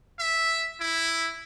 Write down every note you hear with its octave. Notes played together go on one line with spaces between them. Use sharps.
E5
E4